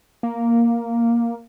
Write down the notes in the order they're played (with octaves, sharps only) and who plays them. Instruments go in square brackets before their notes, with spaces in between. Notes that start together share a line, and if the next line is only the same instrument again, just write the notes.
[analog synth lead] A#3